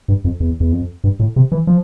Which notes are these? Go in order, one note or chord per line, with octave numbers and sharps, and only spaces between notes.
G2
F2
E2
E2
F2
G2
A2
C3
E3
F3